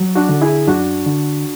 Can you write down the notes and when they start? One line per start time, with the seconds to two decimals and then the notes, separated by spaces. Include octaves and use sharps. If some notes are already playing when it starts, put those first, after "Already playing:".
Already playing: F#3
0.16 D4 F#4
0.29 D3
0.41 E4 G#4
0.67 F#2 D4 F#4
1.06 D3